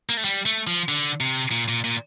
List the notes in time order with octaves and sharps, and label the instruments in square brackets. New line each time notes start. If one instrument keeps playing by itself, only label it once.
[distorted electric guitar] A#3
A3
G3
A3
F3
D3
C3
A#2
A#2
A#2